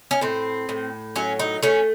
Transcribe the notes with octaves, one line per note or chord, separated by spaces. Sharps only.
C#4
A2 C4
A2
F#3 C#4
D#4
A3 C#4